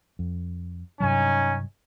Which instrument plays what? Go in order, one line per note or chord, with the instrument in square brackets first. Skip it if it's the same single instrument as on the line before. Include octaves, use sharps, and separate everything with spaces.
[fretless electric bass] F2
[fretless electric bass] G2 C3 F#3 [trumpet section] C#4 D#4 G#5